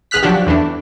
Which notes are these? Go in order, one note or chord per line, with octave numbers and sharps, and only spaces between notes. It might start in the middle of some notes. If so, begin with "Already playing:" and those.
A1 G#4 F6 F#6 B6
F3 F#3 D4 F#4 G4
E2 E3 A3 D4